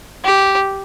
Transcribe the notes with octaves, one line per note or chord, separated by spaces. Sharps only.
G4